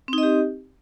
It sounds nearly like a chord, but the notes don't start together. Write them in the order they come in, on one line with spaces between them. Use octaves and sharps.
C4 D#4 D#5 G4